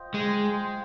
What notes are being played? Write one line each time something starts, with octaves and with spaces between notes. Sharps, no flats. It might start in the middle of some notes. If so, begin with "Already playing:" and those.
Already playing: F4 C5 D#5 G5
G#3